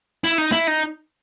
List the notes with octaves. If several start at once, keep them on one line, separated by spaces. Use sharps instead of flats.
E4
D#4
E4
D#4